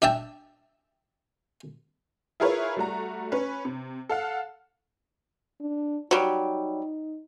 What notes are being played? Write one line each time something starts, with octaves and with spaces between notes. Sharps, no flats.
D4 E5 G5 A5
E4 F4 G#4 A#4 B4 C#5
G3 A3 F#4 A#5
C#4 B4 B5
C3
A4 F5 F#5
D4
F#3 G3 D#4